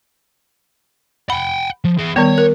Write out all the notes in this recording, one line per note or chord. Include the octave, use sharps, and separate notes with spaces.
F#5 G5 B5
F3
E3 G#4
D#3 G3 B3 C#5
A#4